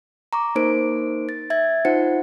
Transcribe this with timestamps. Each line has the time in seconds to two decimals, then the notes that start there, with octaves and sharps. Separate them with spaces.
0.33 A#5 C#6 D6
0.55 A#3 D#4 A#4 C5 D7
1.29 A6
1.50 E5 G#6 A6
1.85 D#4 F4 C5 F#5 C#7